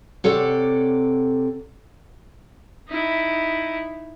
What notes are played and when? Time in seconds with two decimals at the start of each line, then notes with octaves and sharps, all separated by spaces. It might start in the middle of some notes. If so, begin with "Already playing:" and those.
0.24 C3 A4 C#5 D5 F#5
2.88 D#4 E4